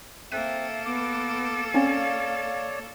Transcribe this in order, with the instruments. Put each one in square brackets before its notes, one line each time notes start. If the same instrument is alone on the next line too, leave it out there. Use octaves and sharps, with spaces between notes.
[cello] A#3 A4 [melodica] C4 [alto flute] E5 [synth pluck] F#6 B6 D#7
[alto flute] B3 [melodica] D6
[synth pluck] C4 C#4 [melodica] C#5 D5 [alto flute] F5